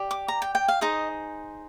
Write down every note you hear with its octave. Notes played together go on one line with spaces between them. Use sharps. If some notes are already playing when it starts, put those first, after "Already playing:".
Already playing: G4 D5
D6
A#5
G5
G5
F5
D#4 G#4 C5 D#5